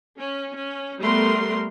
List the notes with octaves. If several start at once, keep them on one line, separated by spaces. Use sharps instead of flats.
C#4
C#4
G3 A3 B3 A#4 C6